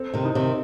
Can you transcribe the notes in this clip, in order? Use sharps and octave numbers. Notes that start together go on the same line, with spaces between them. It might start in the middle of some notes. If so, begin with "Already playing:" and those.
Already playing: C4 A4
C3 D#3
D#4
C3 D#3